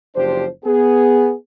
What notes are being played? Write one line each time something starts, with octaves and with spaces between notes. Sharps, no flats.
F#1 F3 D4 G4 C5
B3 G#4